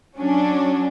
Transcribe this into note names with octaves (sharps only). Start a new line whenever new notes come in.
F#3 C#4 D4